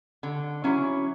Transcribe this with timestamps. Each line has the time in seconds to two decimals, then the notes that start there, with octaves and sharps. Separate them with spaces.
0.23 D3
0.64 F#3 C#4 E4